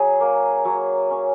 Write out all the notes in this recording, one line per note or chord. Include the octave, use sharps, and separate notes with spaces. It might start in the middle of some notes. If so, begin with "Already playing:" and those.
Already playing: F#3 G#4
A#3
F#3
C#4